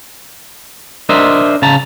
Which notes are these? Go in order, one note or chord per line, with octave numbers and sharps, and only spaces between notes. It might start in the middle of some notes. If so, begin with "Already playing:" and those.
D4 A#4 C5 D#5 E5
C#3 A5 A#5